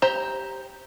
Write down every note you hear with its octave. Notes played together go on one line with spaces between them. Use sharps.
G4 C5 A#5